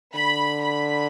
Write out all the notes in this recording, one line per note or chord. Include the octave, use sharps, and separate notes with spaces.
D3 B5
B5